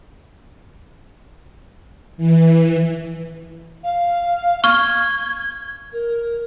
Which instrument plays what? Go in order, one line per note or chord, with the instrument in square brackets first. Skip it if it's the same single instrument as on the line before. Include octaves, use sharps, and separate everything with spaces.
[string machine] E3
[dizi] F5
[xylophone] C#6 F6 [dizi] G#6
[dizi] A#4